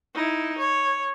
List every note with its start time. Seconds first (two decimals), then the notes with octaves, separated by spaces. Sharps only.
0.14 D#4 E4
0.59 C#5